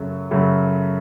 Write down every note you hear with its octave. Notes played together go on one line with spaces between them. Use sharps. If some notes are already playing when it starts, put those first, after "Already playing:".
Already playing: F#2 C#3 F#3 A3
F#2 C#3 F#3 A3